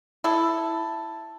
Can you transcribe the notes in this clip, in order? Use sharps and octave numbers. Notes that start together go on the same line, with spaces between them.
E4 A4